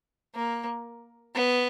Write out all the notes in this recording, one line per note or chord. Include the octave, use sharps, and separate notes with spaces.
A#3
B3